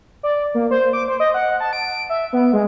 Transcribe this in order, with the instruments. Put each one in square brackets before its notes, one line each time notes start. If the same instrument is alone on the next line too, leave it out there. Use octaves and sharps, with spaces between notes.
[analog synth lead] D5
A#3
C5
D6
C5
D#5
F#5
A5
D7
E5
B3
G#3